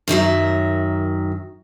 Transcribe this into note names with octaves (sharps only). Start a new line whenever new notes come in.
F#2 D#3 F#3 E5